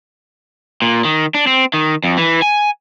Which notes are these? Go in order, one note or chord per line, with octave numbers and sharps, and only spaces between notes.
A#2
D#3
D4
C4
D#3
F2
E3
G#5